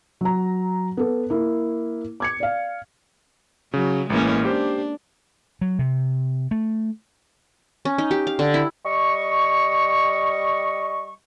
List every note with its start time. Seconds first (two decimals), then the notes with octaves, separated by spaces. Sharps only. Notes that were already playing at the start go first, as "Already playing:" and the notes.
0.21 F#3 A#5
0.97 B3 A4
1.30 A#3 E4
2.20 D6 G#6 C#7
2.40 D5 F5
3.74 C#3 F#3
4.10 A1 E3 G#3 A#3 C#4
4.45 D4 G4 C5
5.61 F#3
5.79 C3
6.51 A3
7.85 C#4
7.98 D#4
8.11 G4
8.27 F5
8.39 D3
8.54 E4
8.85 G3 D#5 C#6